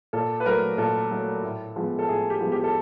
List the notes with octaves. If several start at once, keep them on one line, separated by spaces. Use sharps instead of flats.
A#2 A4
B4
F#3 A3 A#4
A#2 A4
F#3 A3
A2
F3 G#3 B3
A4
A2 G#4
G4
F3 G#3 B3
G4
A4